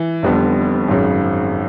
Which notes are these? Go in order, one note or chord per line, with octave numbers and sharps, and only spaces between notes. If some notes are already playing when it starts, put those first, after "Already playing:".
Already playing: E3
F1 F2 D3 G3 B3
G#1 F#2 C#3